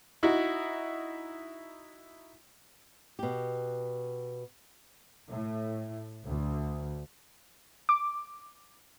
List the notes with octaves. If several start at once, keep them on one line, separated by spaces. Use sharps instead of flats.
D#4 E4 F#4
B2 G4
A2
D2
D6